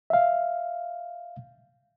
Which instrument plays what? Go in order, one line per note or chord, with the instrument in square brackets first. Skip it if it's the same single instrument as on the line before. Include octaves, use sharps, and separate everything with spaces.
[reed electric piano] E5 F5